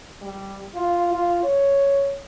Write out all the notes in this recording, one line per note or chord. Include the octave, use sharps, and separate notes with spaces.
G3
F4
F4
C#5